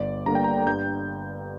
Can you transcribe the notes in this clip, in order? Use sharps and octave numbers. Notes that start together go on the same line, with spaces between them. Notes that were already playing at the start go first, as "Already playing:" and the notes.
Already playing: G1 D5
G2 D3 A#3 A#5
G5
A#5
G2 G6